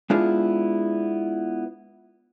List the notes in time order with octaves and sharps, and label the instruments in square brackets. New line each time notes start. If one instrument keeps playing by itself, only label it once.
[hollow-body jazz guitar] G#3 B3 D4 E4 F4 G#4